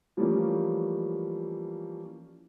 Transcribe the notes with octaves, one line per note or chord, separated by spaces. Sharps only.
E3 F3 G3 A3 A#3 C#4